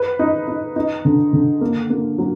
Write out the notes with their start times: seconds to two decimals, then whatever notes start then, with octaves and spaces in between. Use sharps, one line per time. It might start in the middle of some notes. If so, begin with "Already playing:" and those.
Already playing: B4
0.19 D#4
0.48 D#4
0.76 D#4
1.05 D3
1.33 D3
1.61 A#3
1.90 A#3
2.18 F#3